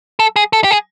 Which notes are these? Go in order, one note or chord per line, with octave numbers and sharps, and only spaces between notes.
A4
G#4
A4
G4
G#4